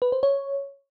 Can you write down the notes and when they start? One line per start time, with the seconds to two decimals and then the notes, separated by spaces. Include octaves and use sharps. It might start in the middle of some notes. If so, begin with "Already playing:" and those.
0.02 B4
0.12 C5
0.23 C#5